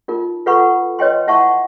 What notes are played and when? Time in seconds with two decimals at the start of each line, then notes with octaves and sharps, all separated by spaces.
0.08 D#4 F4 A#4
0.46 F4 A4 B4 F#5 B5 C#6
0.99 B4 C#5 D#5 G5 C6
1.27 E4 E5 F#5 A5 C6 C#6